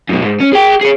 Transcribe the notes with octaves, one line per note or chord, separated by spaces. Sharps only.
F#2 B2
G#2
C#4
G#4 G5
G#4 C#5